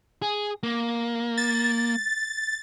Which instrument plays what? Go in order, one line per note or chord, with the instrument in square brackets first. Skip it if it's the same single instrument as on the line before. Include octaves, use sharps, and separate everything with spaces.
[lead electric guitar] G#4
A#3
[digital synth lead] A6